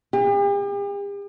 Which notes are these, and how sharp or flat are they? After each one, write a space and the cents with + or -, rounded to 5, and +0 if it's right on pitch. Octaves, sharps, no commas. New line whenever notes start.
G4 +45